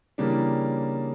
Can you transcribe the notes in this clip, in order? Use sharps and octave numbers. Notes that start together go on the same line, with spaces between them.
C#3 E3 G3 A#3 D4